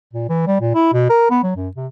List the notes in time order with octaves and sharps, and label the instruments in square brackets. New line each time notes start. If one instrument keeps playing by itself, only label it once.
[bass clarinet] A#2
E3
G3
A#2
E4
B2
A#4
B3
F#3
F#2
C3